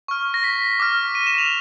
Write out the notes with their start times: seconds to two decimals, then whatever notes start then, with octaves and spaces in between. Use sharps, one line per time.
0.08 C#6 F6
0.34 A#6
0.44 B6
0.80 D6 F6
1.15 D#7
1.27 E7
1.38 F7